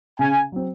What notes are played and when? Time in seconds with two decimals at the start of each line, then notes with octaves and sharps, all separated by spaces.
0.19 C#3 G#5
0.52 F#3 C4